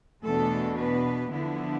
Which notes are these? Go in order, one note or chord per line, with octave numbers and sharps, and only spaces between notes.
E2 B2 A3 B3 D4 A4
B3 B4
D3 F3 B3 D4 E4